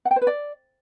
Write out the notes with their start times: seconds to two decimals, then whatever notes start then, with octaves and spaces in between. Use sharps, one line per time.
0.05 F#5
0.11 G5
0.16 C5
0.21 B4
0.27 D5